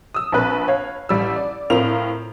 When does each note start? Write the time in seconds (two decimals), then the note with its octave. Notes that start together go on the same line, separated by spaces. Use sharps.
0.14 D#6 E6
0.32 A#1 C4 B4 F#6
0.68 C#5 F5
1.09 A1 G3 E6
1.36 D5
1.70 A2 C4 F4 A#4 F7